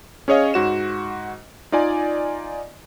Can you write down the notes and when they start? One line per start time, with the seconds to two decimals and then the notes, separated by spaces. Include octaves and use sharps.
0.28 C#4 G#4 C#5 D#5 F5
0.54 G#2 F#4 E7
1.72 D#4 F4 D5 D#5 G#5